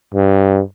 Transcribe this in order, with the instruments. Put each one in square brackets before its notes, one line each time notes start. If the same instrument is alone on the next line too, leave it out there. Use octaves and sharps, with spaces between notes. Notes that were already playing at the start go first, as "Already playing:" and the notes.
[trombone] G2